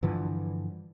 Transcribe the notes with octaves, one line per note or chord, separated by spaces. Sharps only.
G2 D3 E3 F3